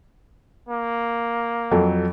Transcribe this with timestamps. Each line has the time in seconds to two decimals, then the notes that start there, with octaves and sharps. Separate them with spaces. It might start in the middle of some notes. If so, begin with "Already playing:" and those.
0.69 A#3
1.71 F2 F#3 A4